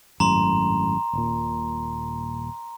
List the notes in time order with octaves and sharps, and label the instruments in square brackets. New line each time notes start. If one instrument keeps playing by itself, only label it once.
[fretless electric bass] G#1 F#2 A2 [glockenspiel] A#5 C6
[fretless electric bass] D#1 A#2